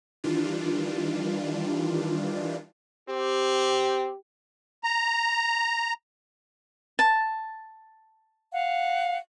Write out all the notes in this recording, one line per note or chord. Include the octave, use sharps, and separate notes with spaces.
D#3 E3 G3 D4 F4
C4 G4
A#5
A5
F5 F#5